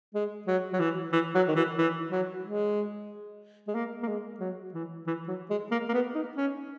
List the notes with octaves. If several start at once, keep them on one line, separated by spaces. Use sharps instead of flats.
G#3
F#3
F#3
E3
E3
F#3
D#3
E3
E3
F#3
G#3
G#3
A#3
A#3
G#3
F#3
E3
E3
F#3
G#3
A#3
A#3
B3
D#4
C#4